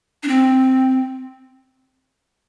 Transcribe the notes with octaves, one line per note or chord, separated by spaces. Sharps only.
D4
C4